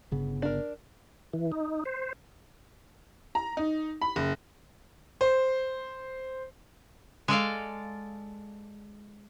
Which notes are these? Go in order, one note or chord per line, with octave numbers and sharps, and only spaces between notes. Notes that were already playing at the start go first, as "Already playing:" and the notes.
G1 C#3 B3
D4 A#4
E3
D#4
C5
A#5
D#4
B5
F#1
C5
G#3 A4 D5 F5